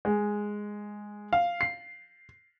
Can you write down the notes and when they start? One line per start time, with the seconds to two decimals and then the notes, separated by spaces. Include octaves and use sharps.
0.05 G#3
1.33 F5
1.61 C7